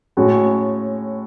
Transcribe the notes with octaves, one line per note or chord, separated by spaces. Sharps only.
A2 G#3 C#4 F#4